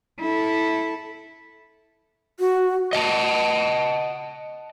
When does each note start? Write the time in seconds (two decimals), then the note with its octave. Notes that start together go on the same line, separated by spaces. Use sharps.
0.20 E4 A4
2.40 F#4
2.93 D#5 F#5 A5